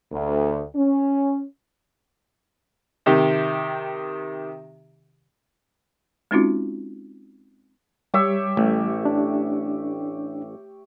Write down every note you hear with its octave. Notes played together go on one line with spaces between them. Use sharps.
D2
C#4
C3 D#3 G4
G#3 C4 C#4 D#4 F4 F#4
G3 G4 C#5 E5
A1 A3
D4